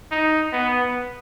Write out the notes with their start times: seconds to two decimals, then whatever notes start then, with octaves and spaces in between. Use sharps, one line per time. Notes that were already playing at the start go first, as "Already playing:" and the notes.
0.11 D#4
0.52 B3